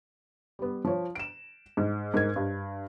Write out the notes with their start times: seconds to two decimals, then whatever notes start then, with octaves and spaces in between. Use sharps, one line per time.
0.59 G3 B3
0.85 F3 C#5
1.15 D7 E7
1.77 G#2
2.14 G#2 A#4 G#6
2.36 G2